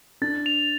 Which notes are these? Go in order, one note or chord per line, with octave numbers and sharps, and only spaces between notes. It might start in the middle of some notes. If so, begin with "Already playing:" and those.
D4 A6
F7